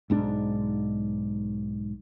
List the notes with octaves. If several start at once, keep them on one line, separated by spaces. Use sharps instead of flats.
B1 G#2 D4